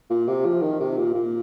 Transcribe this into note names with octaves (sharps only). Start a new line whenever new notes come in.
A#2
C3
F3
D#3
C3
A#2
A#2